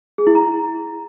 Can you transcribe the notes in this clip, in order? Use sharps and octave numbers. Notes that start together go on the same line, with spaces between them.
G#4
E4
A#5